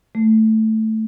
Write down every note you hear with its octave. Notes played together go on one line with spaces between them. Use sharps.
A3